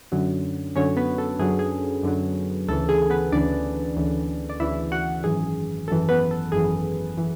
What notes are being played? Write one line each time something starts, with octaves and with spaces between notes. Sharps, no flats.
F#2 D3 F#3
F#2 D3 F#3 C#4 C#5
B3 B4
A4
F#2 D3 F#3 G#4
G#4
F#2 D3 F#3
D2 C#3 E3 A4
G#4
B3 B4
D2 C#3 E3 D4 D5
D2 C#3 E3
D5
D2 C#3 E3 E4 E5
F#4 F#5
G#1 F#2 E3 G#4
G#1 F#2 E3 A4
B3 B4
A4
G#1 F#2 E3 G#4
E3